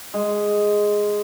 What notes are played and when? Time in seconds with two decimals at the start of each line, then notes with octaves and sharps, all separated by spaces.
0.14 G#3